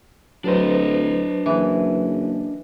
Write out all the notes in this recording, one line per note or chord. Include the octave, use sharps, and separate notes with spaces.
D1 F#3 D4 B4 C5 D#5
F#1 E3